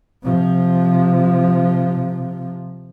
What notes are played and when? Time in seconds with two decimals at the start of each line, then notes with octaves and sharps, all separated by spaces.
0.23 C3 F3